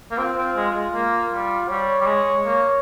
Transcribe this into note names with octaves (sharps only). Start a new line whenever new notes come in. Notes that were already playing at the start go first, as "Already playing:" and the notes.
A#3
C4 F4
C4
G#3
G#3
A#3
G3
G3 C#5
G3
G#3
A#3